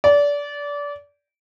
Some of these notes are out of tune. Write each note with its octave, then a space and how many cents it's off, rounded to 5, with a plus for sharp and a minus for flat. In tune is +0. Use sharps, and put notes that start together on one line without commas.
D5 -25